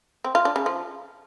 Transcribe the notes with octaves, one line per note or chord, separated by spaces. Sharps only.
C4
F4
D4
C#3
F3